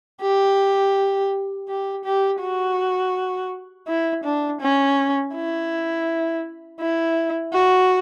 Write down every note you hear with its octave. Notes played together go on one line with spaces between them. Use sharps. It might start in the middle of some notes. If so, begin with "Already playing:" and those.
G4
G4
G4
F#4
E4
D4
C#4
E4
E4
F#4